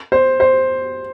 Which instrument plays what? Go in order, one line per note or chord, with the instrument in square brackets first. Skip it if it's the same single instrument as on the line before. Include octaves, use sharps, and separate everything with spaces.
[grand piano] C5
C5